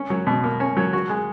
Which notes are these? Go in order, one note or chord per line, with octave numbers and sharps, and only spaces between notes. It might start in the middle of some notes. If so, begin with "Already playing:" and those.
Already playing: C#4
F#3
B2
A#3
C#4
F#3
F#4
G#3